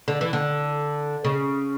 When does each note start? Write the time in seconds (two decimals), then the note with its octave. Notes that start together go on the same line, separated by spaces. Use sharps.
0.08 D3
0.21 E3
0.33 D3
1.25 C#3